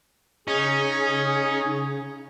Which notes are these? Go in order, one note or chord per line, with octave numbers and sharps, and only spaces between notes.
C#3 C#4 D#4 G#4